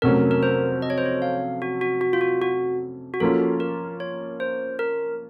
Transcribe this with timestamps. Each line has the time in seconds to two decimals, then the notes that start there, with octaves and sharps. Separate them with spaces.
0.02 F2 C3 F#3 A3 C#4 A#4
0.31 A#4
0.43 C5
0.82 D#5
0.90 C#5
0.98 C5
1.06 C#5
1.22 F5
1.62 F#4
1.81 F#4
2.01 F#4
2.13 F4
2.21 F#4
2.42 F#4
3.14 F#4
3.20 F3 A#3 C#4 F4 A4
3.60 A#4
4.00 C#5
4.40 C5
4.79 A#4